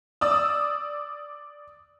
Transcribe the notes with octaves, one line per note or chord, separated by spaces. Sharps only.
D5 D#6 E6